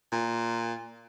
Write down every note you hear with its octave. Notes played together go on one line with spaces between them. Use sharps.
A#2